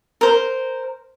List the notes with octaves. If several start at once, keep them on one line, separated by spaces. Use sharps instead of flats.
A#4 C5